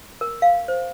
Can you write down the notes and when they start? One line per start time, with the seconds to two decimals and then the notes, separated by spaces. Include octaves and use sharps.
0.21 A#4
0.42 F5
0.68 C5